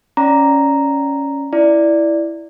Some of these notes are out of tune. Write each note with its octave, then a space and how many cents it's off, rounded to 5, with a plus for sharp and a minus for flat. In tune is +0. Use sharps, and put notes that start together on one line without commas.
C#4 +0 D5 +0 A#5 +0
E4 +0 D5 +0